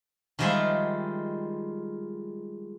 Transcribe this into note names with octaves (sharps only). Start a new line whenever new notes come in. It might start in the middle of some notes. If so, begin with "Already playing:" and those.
D#3 F3 G3 G#3 F4 E5